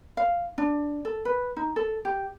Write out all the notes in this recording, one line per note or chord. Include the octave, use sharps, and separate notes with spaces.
F5
D4
A4
B4
D#4
A4
G4